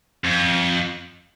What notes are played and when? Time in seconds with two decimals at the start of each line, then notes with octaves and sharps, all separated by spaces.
0.24 F2